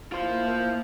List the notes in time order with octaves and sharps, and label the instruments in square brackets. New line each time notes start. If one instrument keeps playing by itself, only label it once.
[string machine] A#3 E4 [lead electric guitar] F4 C5